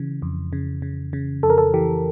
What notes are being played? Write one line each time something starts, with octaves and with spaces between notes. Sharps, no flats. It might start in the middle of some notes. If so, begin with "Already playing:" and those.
Already playing: C#3 E3
F2
C#3
C#3
C#3
F2 A4
A#4
A4
E3 G4